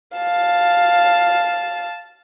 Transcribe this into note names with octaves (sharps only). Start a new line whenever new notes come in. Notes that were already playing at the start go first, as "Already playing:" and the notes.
F5 A5